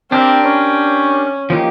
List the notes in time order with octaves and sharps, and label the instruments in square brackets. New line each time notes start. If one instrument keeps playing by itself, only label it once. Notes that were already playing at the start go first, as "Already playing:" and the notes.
[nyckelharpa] C4 [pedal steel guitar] D4 G4 A#4
[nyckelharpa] C#4
[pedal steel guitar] F3 A#3 D#4 G4